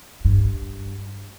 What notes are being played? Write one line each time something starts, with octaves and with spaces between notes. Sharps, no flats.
G2